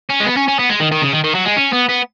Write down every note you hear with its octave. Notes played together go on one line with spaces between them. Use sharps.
C#4
G#3
B3
C#4
C#4
B3
G#3
D#3
D#3
C#3
D#3
D#3
F#3
G#3
C#4
B3
B3